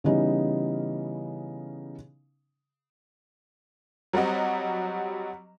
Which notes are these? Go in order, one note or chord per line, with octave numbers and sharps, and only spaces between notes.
C#3 E3 G3 B3 C#4 D#4
F#3 G3 C4 F#4 D#5